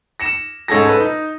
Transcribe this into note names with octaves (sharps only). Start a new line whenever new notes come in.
A#6 C#7 E7
G#2 C#4 G#4 A4 A#6
A4 B4
D#4